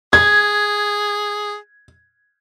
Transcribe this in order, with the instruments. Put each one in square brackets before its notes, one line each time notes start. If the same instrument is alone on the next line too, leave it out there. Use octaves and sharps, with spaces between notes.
[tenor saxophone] G#4 [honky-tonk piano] G#6